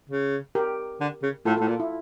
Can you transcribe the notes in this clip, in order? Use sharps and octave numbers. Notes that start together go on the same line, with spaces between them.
C#3
G4 A#4
D3
C#3
A2 F4 A4
A2 F4 A4
A#2 F4
E4